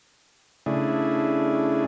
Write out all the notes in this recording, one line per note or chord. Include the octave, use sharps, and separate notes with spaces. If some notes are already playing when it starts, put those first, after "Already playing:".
C#3 A3 D4 E4 G#4